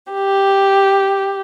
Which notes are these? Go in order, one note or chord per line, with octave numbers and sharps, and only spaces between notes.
G4